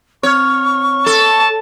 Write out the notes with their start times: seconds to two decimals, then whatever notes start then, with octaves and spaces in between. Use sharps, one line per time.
0.23 C4 C#5 C#6 F6
1.06 A4 A5